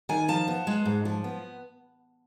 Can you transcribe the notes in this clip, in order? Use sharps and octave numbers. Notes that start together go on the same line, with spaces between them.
D#3 G#5
F3 A5
B3
G#3
G#2
F3
B3